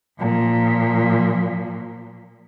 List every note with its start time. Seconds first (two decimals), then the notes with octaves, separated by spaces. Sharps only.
0.20 A#2 F3